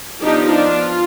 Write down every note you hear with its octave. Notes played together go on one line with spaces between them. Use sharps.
F3 B3 D4 D#4 G4
D4 F4